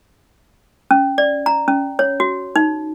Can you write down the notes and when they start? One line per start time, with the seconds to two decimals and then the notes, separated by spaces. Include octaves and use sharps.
0.91 C#4
1.18 D5
1.46 A#5
1.68 C#4
1.99 C#5
2.20 F#4
2.56 D#4